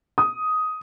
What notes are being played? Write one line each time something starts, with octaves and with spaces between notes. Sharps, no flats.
D#6